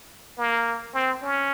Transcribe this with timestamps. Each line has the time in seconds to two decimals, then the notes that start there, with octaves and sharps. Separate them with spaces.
0.38 A#3
0.94 C4
1.22 C#4